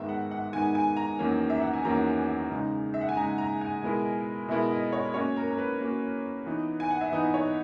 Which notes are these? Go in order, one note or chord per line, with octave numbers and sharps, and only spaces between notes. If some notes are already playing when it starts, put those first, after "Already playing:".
Already playing: G#2 D#3 G#3 B3 E5
F#5
F#5
G#2 D#3 G#3 B3 G#5
G#5
A#5
E2 D#3 F#3 A#3 C#4
E5
F#5
G#5
E2 D#3 F#3 A#3 C#4 A#5
C#3 G#3 D#4
E5
F#5
G#5
C#3 G#3 D#4 A#5
A#5
G#5
B2 G#3 B3 E4 A#4
B2 G#3 B3 E4 A#4 E5
D#5
C#5
A#3 C#4 F#4 C#5
A#4
A#4
B4
A#3 C#4 F#4
E3 B3 D#4
G#5
F#5
E5
E3 B3 D#4 D#5
C#5